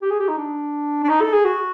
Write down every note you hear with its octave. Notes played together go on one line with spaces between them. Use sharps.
G4
G#4
G4
D#4
D4
D4
D#4
A4
G#4
F#4